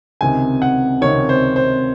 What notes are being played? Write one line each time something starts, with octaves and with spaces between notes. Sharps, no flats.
C#2 C3 D#3 G#5
F#5
C#2 C3 D#3 C#5
C5
C5